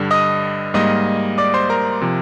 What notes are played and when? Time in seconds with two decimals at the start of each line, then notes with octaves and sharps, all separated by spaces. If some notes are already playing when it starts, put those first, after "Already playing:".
Already playing: G2 D3 G3
0.11 D#5 D#6
0.74 G#2 G3 A#3 D#5 D#6
1.38 D5 D6
1.54 C5 C6
1.70 A#4 A#5
2.01 C3 F3